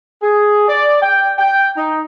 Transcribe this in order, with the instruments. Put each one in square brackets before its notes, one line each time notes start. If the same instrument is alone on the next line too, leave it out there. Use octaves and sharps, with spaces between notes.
[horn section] G#4
D5
G5
G5
D#4